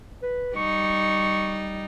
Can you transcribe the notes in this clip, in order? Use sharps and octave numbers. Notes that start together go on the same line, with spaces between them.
B4
G3 D#4 C#6